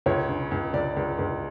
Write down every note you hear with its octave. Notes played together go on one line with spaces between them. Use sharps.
C#2 C#5
C#3
C#2
C#2 D5
C#2
C#2